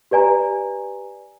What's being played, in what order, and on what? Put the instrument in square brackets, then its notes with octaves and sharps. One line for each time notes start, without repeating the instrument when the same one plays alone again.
[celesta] G4 B4 D5 G#5 A#5